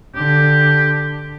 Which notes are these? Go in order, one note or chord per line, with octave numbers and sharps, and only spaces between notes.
D3 G4